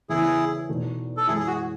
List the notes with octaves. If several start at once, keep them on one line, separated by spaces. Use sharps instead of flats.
E2 C#3 E3 A3 E4 G#4
E2 B2 A3 D#4
A4
F#2 E3 G#3 E4 G#4
G#4
F#4